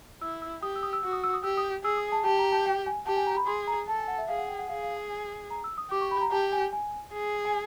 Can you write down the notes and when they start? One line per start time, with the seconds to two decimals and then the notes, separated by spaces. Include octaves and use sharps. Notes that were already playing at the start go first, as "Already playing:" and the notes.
0.21 E4 E6
0.42 E6
0.62 G4 D#6
0.76 E6
0.83 D#6
0.93 E6
1.03 F#4 E6
1.13 D#6
1.24 E6
1.34 D#6
1.44 G4 E6
1.57 D#6
1.84 G#4 E6
1.98 D#6
2.12 A5
2.25 G4 A5
2.39 A#5
2.52 A5
2.66 G5
2.86 G#5
3.07 G4 A5
3.17 G#5
3.27 A#5
3.37 B5
3.47 G#4 C6
3.67 A#5
3.88 A4 A5
3.98 G#5
4.08 F#5
4.18 E5
4.28 G#4 F5
4.38 F#5
4.48 G5
4.59 F#5
4.69 G#4 F5
4.83 F5
4.97 G#5
5.51 A#5
5.64 E6
5.78 D#6
5.91 G4 D6
6.01 C#6
6.11 B5
6.22 A#5
6.32 G4 A5
6.52 G#5
6.73 G#5
7.14 G#4
7.45 G#5